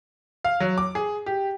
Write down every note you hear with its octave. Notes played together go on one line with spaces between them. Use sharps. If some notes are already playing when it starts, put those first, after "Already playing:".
F5
F#3
D6
G#4
G4